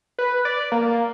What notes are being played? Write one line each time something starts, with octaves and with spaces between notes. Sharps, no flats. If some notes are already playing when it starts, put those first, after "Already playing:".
B4
D5
A#3